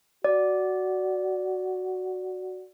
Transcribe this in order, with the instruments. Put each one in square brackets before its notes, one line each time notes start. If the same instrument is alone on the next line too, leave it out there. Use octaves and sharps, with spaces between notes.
[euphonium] F#4 [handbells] D5